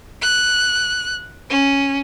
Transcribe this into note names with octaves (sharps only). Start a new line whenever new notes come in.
F#6
C#4